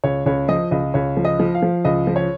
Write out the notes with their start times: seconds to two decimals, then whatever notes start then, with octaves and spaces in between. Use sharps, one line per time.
0.04 C#2 C#5
0.26 C#2 C#5
0.49 F3 D#5
0.71 C#2 D#5
0.94 C#2 C#5
1.17 F3
1.25 D#5
1.40 F3
1.55 F5
1.63 F3
1.85 C#2 D#5
2.07 F3
2.16 C#5